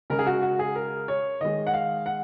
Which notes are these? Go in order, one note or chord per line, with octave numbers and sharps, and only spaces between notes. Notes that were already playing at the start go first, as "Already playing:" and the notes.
C#3 G#3 A#4
G#4
F#4
F#4
G#4
A#4
C#5
D#3 G#3 D#5
F#5
F5
F#5